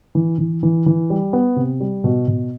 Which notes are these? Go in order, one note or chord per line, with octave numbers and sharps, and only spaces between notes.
E3
E3
E3
E3
G3
B3
C3
G3
B2
B2